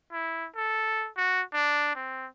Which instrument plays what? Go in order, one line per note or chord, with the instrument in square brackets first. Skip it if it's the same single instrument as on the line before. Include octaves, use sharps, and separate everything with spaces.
[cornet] E4
A4
F#4
D4
C4